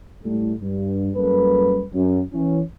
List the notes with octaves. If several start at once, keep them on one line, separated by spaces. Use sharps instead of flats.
A2 G3 A3
G2
F#2 G3 A#3 A4 B4
F#2
E3 C#4